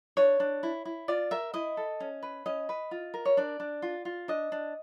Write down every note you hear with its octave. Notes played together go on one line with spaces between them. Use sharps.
D4 C#5
D4
E4
E4
F4 D5
A#4 E5
E4 D#5
A4
C#4
B4
C#4 D#5
B4
F4
A#4
C#5
D4 D5
D4
F4
F4
D4 D#5
D4